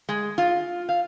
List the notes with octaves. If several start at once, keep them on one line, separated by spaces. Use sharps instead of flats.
G#3
F4
F5